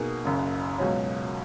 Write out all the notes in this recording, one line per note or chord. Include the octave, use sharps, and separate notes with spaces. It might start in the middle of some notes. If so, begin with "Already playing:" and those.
Already playing: B2 A#3 D#4 G#4
F#1 F#2 C#3
C#2 B2 F#3 C#4